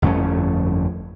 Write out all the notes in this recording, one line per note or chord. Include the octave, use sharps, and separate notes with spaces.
G1 F2 A3 C#4